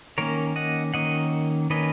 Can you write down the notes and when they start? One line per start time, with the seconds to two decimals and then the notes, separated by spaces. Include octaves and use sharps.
0.18 D#3 A#3 C#4 A#4 C#5
0.56 D#5 F#5
0.94 D#3 A#3 C#4 D#5 F#5
1.70 D#3 A#3 C#4 B4 D#5